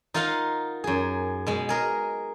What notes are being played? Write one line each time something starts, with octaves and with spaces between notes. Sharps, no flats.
D#4 F4 A#4 D#5 F5 F#5
F#2 G#4
B2 G#3
G#4 A#4 D#5